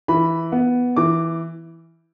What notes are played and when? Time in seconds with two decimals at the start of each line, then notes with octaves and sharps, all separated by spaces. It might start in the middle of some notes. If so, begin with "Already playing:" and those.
0.08 E3 B5
0.52 B3
0.97 E3 D6